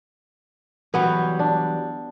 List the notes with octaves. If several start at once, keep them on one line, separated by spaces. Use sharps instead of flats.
E3 F#3 G3 B3
D4